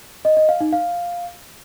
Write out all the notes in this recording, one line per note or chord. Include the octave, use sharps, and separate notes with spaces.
D#5
D#5
F5
D#4
F5